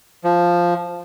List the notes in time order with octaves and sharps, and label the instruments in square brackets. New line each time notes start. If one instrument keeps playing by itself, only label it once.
[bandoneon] F3